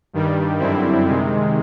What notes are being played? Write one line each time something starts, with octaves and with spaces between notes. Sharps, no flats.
G2 D#3 G3
F#2 D3 G3 C4 E4
C3 D#3 G#3